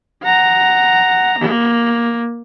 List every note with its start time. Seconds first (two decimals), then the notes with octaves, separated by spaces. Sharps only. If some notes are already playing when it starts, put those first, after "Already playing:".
0.24 F#5 A#5
1.39 A#3